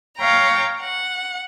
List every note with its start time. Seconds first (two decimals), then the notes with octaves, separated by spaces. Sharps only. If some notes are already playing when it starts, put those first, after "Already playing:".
0.19 C#5 F5 G5 A#5
0.81 F#5